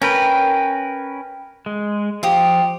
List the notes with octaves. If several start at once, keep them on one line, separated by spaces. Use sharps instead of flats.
C#4 A#4 B4 G5
G#3
F3 G4 F5 D#6